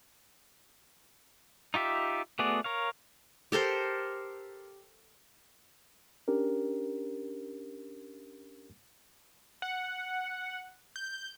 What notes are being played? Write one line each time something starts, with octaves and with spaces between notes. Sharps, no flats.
D#4 F4 G4 E5
A3 B3 F#4 G#4 D5
A#4 C#5 F5
G4 A4 A#4 C5
C#4 D4 G4 A#4
F#5
G6